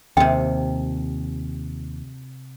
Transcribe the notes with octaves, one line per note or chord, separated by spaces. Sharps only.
D#2 C3 F4 G5